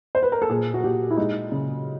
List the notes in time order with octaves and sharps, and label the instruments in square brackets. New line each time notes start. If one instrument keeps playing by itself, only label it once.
[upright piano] C5
B4
A#4
A4
A#2 G#4
F#4
A#2 G4
E4
G#3 D#4
C#3